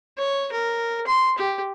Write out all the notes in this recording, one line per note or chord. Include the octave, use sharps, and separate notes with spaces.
C#5
A#4
C6
G4